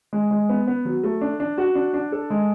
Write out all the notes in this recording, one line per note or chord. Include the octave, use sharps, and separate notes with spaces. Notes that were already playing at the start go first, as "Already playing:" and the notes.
G#3
G#3
B3
B3
F#3
A3
D4
D4
F#4
D4
D4
A4
G#3